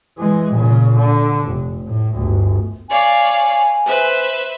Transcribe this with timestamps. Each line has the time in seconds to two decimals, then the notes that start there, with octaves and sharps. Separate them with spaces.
0.18 E3 G#3
0.53 A#2 C#3
0.98 D3
1.48 F1
1.87 A2
2.16 G1 D2
2.89 C#5 D5 F5 G#5
3.85 B4 C5 E5